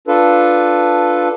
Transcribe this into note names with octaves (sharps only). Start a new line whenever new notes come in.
D4 F4 A4 B4